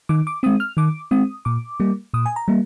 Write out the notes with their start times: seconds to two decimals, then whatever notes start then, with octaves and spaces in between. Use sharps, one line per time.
0.09 D#3 D6
0.27 D6
0.43 G#3 C4 D#6
0.60 F6
0.77 D#3 D6
1.11 G#3 C4 D#6
1.45 A#2 D6
1.80 G3 A#3
2.14 A#2 D#6
2.26 G#5
2.36 A#5
2.48 G3 A#3